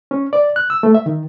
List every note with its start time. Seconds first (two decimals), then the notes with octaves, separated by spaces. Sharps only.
0.11 C#4
0.33 D5
0.56 F#6
0.70 E6
0.83 A3
0.95 E5
1.06 D#3